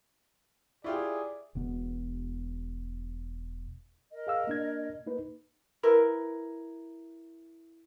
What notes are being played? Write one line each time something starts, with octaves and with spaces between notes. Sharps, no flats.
E4 F4 G4 G#4 C5 D5 E5 C#6
E1 B2 B3
A#4 D#5
G#4 F5 E6
A#3 D4 G#6
A#3 D#4 B4
E4 A#4 B4